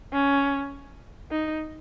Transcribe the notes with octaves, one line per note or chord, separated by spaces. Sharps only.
C#4
D#4